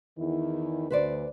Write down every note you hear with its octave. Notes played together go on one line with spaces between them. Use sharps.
E2 D#3 E4
D2 B4 C5 D5